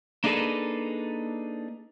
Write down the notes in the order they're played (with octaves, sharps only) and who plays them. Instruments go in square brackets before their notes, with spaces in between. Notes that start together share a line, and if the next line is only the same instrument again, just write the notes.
[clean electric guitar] A#3 D4 D#4 G#4 A4 B4